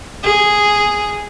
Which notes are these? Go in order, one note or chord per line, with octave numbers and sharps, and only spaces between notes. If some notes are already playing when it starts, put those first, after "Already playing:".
G#4